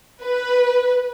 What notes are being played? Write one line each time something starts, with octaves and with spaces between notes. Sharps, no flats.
B4